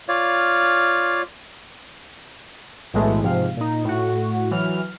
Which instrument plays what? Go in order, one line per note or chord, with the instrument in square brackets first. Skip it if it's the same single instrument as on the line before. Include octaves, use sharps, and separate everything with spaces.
[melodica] F4 C#5 D5 F5
[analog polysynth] B1 A2 E3 G#3 A3
G#2 C3 F3 F5
A#2 D#4
A2 F#4
E3 F#3 F6